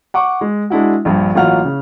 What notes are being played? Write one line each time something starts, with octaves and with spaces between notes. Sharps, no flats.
F#5 C#6 D6
G#3
G#3 D4 E4 F#4
A#1 G2
A1 F#3 A#3 F4 F#5 F6
C#3